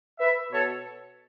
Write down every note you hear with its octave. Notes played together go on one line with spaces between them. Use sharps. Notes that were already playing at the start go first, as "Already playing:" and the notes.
B4 E5
B2 A4 C#5